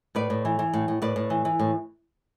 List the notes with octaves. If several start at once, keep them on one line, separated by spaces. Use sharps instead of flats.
A2 B4 D5
A2
E3
E3
A2
A2
A2 B4 D5
A2
E3
E3
A2